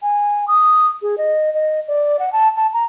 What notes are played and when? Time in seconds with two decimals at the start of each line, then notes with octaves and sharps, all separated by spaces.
0.02 G#5
0.48 D#6
1.02 G#4
1.18 D#5
1.54 D#5
1.88 D5
2.19 F#5
2.33 A5
2.57 A5
2.73 A#5